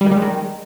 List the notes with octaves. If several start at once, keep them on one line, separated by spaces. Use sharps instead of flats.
G3
D#3
G3
G#3
D#3